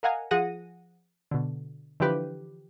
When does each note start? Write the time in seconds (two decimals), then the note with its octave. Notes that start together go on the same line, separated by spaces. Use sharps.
0.03 A#4 D#5 F5 F#5 G#5 A#5
0.31 F3 G#4 F#5 A#6 D#7
1.31 B2 D3
2.00 D3 E3 F3 G4 B4